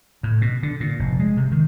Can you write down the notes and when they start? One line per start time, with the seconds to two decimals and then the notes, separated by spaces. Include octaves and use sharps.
0.23 A2
0.41 B2
0.63 D3
0.80 A#2
0.99 F1
1.19 G#3
1.37 C3
1.52 D#3